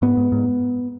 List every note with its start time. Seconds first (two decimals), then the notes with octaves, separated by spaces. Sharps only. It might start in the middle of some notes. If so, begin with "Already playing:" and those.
0.02 G#2 B3
0.17 G#2
0.32 G#2